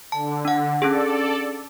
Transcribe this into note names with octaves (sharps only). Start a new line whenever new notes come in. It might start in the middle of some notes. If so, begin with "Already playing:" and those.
D3 A5
D4 F#5
C#4 D4 G#4 A4 D5